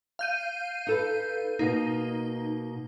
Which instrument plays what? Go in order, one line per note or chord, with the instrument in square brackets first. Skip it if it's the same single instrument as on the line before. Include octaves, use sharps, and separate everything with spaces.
[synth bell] F5 G6 D#7
[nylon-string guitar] D#4 A4 B4
[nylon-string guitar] B2 A#3 [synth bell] D#4